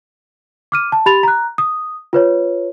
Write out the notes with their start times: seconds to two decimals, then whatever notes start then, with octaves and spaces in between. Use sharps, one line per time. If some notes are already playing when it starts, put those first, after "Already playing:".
0.72 D6 F6 D#7
0.92 A5
1.06 G4 B5 A6 F7
1.23 A#5 F#6
1.58 D#6
2.13 F4 B4 C#5